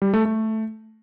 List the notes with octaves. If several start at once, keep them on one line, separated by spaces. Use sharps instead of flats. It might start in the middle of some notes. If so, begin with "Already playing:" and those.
G3
A3
A3